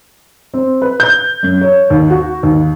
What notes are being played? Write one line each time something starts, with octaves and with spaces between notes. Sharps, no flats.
C4
B4
G6
F#2
C#5
D#2
F#4
D#2